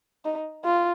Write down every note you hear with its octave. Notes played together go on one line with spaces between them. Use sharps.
D#4
F4